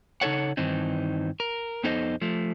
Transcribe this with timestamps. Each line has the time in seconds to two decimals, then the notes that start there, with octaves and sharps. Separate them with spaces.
0.21 C#3 D#4 F4 A4 C#5 F#5
0.57 G2 D#3 E3 C4 D#4
1.40 A#4
1.84 F2 B3 D#4 A4 C5 D#5
2.21 F3 A3